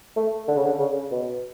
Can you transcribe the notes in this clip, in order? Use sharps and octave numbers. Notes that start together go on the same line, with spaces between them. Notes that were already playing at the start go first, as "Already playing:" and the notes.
A3
D3
C#3
D3
C#3
B2